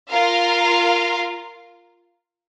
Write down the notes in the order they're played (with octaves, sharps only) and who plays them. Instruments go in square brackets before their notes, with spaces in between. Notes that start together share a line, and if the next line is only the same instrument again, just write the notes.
[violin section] F4 A#4 F5